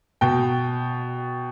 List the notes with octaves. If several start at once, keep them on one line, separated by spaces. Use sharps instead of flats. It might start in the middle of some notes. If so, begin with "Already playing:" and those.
B2 G5